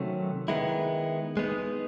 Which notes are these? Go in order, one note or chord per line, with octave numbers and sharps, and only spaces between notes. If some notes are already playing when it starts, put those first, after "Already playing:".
Already playing: C3 D#3 F#3 A3 C#4
D#3 G#3 B3 E4
G#3 B3 D#4